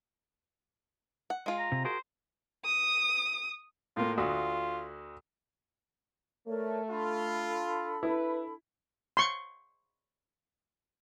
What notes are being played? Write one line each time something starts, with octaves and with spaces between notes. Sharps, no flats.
F#5
G#3 F4
A#5
C3
F#4 G#4 A#4 C5
D#6
A2 A#3 F4
D2 F4 F#4 D#6
A3 A#4 C#5 D5
D4 F4 A4 B5
E4 B4
C6 C#6